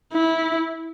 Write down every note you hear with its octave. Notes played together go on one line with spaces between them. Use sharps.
E4